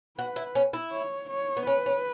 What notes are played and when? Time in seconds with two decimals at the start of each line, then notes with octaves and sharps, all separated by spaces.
0.18 F#4 B4
0.36 E4
0.55 C#4
0.73 E4
0.92 C#5
1.30 C#5
1.57 B3
1.67 C#4 B4
1.86 C#4